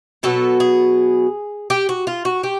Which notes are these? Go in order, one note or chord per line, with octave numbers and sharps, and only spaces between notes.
B2 F#3 B3 A4
G#4
G4
F#4
F4
F#4
G4